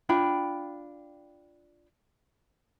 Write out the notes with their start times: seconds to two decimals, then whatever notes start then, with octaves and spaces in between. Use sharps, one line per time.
0.09 D4 F4 G5 B5